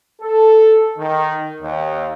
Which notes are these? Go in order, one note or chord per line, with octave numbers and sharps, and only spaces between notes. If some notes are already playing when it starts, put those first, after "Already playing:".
A4
D#3
D#2